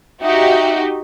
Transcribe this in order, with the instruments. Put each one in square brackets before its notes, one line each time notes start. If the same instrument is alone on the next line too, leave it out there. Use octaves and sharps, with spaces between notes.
[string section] D#4 F#4 G4 [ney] E5